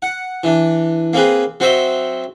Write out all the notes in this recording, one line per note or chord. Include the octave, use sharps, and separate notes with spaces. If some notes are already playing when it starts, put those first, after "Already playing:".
F#5
E3 D4
A#3 C4 G#4 B4
F#3 C4 C5 D#5 E5